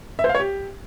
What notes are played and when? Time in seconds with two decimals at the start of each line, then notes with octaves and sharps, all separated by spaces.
0.19 E5
0.24 C5
0.29 F5
0.35 C#5
0.40 G4